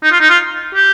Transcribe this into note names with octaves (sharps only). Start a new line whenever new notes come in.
D#4
F4
D#4
F4
G4